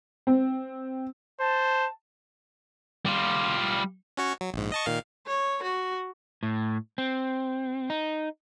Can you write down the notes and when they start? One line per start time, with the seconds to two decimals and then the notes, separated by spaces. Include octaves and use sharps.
0.27 C4
1.41 C5 A5
3.06 G3 F4
4.17 C#4 F#4 C#5
4.41 F#3
4.54 A#1 G#2
4.72 D#5 A5 C#6
4.86 A#2 D#3 F5
5.27 C#5
5.63 F#4
6.43 A2
6.98 C4
7.90 D#4